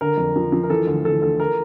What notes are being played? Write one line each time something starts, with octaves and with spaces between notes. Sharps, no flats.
D3 A#4
F2
F3
F3
A#4
E3 A4
D2
E3 A4
D2 A4
A#4